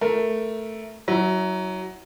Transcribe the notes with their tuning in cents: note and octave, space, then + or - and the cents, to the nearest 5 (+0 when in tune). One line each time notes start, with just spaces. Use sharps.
A3 +0 A#4 +10
F#3 +15 E4 -25